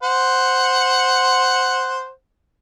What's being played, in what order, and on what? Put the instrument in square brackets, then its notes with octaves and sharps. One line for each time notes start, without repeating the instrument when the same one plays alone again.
[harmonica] C5 F#5